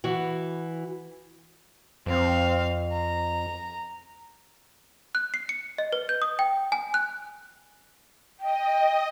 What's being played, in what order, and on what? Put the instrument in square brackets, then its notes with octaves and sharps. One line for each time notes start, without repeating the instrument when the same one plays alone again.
[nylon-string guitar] E3 F#4
[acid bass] F2 [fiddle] C4 F5
[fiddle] A#5
[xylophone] F#6
C7
C#7
D#5
B4
G6
D#6
G5
G#5
F#6
[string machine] D#5 [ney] G5